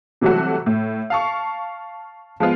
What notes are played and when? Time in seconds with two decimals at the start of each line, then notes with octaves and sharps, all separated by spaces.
0.21 C3 E3 F#3 G3 A3 F#4
0.66 A2
1.10 F5 A5 C#6
2.40 F3 G#3 B3 F4